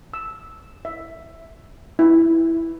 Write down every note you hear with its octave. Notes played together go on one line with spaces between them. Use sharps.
E6
E5
E4